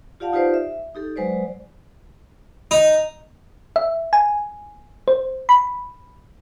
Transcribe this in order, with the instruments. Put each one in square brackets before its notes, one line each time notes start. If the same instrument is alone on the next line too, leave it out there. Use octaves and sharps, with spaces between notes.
[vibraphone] F4 G4 D5 F5 F#5 A5
D#4 F4 G4 B4 C5 D5
E5
D#4 G4 A4
F#3 G#3 B4 C5 D5
[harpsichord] D#4
[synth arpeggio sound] E5
G#5
C5
B5